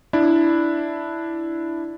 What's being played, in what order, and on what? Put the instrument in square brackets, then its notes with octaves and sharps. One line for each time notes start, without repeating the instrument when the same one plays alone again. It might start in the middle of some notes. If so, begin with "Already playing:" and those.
[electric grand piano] D4 E4